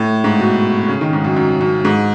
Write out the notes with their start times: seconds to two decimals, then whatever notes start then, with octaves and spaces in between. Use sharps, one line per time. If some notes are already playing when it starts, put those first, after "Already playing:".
Already playing: A2
0.24 G#2
0.40 B2
0.82 B2
0.88 C#3
1.01 D#3
1.13 G#2
1.25 F#2
1.36 F#2
1.61 F#2
1.85 G#2